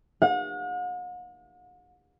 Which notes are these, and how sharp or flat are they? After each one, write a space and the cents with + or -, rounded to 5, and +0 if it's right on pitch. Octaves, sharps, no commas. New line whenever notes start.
F#5 -45